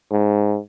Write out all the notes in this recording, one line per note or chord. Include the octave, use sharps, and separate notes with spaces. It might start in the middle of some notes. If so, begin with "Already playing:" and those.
G#2